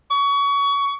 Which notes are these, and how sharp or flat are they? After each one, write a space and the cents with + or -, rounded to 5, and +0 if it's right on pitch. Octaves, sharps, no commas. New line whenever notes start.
C#6 +25